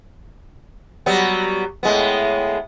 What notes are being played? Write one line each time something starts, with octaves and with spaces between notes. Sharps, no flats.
F#3 G3 B3
A2 G#3 B3